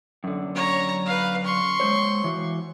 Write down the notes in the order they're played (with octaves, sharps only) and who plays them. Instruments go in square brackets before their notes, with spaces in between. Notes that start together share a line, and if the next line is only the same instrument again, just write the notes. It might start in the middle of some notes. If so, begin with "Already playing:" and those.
[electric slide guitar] F#2 D3
[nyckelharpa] C#5 A#5
B4 F5
C6 C#6
[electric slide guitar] G#3 C5 C#5
E3 F#4